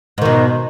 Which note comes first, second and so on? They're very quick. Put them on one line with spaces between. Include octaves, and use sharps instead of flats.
G#2 D#3 B2